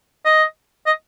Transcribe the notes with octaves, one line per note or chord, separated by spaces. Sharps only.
D#5
D#5